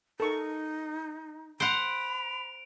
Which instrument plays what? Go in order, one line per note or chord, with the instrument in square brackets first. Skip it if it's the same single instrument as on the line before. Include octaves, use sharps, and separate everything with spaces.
[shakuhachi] D#4 [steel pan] A4 A#4 C#6
[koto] C5 F#5 [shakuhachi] B5 [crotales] D7 F7